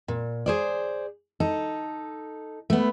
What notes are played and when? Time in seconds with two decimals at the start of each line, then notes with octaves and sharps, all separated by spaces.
0.08 A#2
0.46 G#4 C5 D5
1.40 D#4 A4
2.70 A3 B3